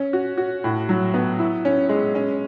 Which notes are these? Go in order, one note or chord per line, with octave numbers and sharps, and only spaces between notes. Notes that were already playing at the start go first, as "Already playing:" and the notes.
Already playing: C#4
F#4
F#4
A2
F#3
B3
E4
C#4
G#3
C#4